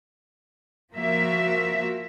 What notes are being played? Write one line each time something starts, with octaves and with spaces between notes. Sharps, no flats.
F3 A#3 F#4 E5